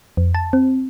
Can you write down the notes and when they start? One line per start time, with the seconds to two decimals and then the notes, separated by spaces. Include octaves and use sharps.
0.17 F2
0.35 A5
0.53 C4